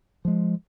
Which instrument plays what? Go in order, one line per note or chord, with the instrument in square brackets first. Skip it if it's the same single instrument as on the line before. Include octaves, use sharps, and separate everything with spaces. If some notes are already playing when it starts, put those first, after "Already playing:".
[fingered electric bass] F3 G#3